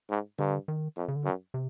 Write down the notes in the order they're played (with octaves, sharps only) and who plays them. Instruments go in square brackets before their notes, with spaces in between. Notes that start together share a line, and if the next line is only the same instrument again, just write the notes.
[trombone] G#2
[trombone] G2 [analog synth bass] D3
[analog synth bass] D#3
[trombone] F2
[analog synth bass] C#3
D3
[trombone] F#2
[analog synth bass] C3